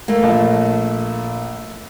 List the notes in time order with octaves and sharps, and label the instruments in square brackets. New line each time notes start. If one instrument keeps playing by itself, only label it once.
[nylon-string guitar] A3 A#3
[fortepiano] A#1 D#5 A5